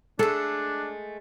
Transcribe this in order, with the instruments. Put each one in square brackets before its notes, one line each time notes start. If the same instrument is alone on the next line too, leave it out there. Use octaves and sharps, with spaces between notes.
[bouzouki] G#3 A3 [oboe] D4 [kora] A4